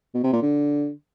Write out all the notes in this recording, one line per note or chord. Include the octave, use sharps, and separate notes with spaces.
B2
C3
A#2
D3